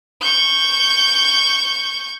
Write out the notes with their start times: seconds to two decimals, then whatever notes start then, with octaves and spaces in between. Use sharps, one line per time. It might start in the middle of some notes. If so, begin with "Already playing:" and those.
0.21 C#6 G6